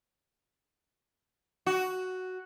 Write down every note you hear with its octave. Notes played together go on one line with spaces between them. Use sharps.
F#4